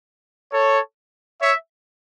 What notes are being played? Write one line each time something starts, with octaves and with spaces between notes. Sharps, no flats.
A4 C#5
C#5 E5